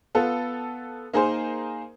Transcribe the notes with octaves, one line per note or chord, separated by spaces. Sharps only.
B3 F4 A4
A#3 D#4 G#4 A#4 C5